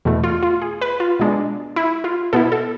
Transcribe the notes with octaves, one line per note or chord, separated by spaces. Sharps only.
E2 B2 A3
F4
F4
G#4
B4
F4
B2 G#3 D4
E4
F4
B2 B3 E4 A4
A4